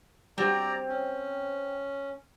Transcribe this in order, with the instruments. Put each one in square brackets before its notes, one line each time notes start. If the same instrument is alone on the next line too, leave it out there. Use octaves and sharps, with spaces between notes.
[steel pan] G3 F#4 [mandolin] C4 [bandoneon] D5 A#5
[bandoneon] C#4